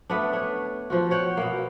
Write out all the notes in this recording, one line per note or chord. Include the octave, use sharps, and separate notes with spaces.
A3 B3 D4
D4 C#5
F3 F4 F#4
F#4 C#5 F#5 G5
B2 A#3